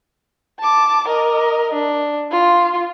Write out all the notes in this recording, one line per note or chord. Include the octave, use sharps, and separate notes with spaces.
A5 D6
A#4 D#5
D4
F4